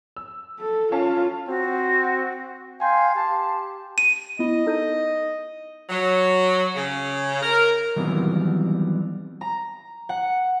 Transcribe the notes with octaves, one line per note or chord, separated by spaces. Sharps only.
E6
A4
C#4 F4 F5 A5
C4 F#4
F5 G5 G#5 C6 G6
G4 A5
D#7
B3 E4 D#5
D#4 A4 G6
F#3
C#3
A#4
D#3 E3 F#3 G3 B3 C4
A#5
F#5